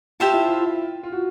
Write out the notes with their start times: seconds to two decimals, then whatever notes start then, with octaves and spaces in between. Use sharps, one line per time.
0.20 F4 G4 C5 E5 A5
0.33 E4
0.48 F4
1.03 F4
1.12 F#4